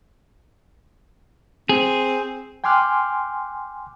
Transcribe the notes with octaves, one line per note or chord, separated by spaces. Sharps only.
C4 G#4
G5 G#5 C6 D6 F6 F#6